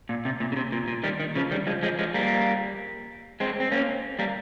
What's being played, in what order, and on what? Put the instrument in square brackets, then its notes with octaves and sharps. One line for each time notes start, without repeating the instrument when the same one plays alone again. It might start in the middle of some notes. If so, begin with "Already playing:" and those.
[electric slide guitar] A#2
C3
A#2
C#3
C3
A#2
A#2
D#3 G3
D#3
C#3 F3
D#3 G3
F3 G#3
F3 G#3
F3 G#3
G3 A#3
G#3 C4
C4
A#3 C#4
G3 A#3